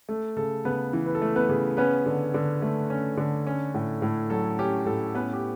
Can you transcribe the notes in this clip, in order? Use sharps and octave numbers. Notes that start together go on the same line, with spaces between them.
A3 A4
C#3 A4
C#3 B3 B4
E3
B4
A4
A3
B3 B4
C#3
B3 C#4 B4
D3
D3
A3
C#4
D3
C#4
A2
A2
F#3 A4
C#4 G4
A2 A4
B3 C#4 B4
G4